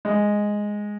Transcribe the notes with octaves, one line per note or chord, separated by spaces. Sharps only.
G#3